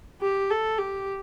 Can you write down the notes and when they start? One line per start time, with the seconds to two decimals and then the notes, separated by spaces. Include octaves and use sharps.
0.22 G4
0.50 A4
0.78 G4